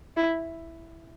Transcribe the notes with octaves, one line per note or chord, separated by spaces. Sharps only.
E4